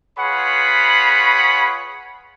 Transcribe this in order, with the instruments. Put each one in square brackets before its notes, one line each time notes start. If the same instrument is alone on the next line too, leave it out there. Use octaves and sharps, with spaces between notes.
[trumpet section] F4 G#4 B4 C#5 F#5 B5